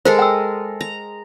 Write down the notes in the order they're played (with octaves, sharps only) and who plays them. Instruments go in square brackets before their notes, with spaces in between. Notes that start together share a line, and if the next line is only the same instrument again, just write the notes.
[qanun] G#3 A4 A#4 [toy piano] C5
[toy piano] G5 E6
[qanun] A#5